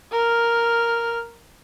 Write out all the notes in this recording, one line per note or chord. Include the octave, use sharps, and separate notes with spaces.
A#4 F6